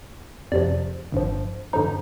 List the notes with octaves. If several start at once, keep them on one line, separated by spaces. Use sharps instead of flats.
F2 C3 F3 D5
G1 G2 F3
G2 D3 F3 D#4